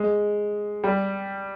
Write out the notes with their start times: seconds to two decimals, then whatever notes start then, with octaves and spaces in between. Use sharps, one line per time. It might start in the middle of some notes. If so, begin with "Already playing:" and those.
Already playing: G#3
0.84 G3